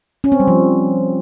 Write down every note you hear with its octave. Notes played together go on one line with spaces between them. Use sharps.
C#4
C4
G3
F3